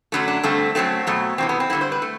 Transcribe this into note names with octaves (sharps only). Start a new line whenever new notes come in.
F#2 D3 F#3 A3
D4
G2 D3 A3 C4
F#2 F#3 A3 C4
B2 F#3 A3
E2 C3 E3 C4
B3
C4
G2 D3 G3 E4
C5
B4
A3